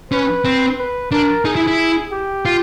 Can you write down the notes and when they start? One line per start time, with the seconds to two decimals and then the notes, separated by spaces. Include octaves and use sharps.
0.11 C#4 B4
0.45 C4
0.78 B4
1.12 D4 A#4
1.45 D#4 G#4
1.56 E4
1.68 E4
2.12 G4
2.45 F4